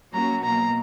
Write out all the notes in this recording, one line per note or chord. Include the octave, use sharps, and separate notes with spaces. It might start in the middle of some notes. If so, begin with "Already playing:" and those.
F#3 A#3 C#4 F#4 A#5
B2 F#3 A#3 A#5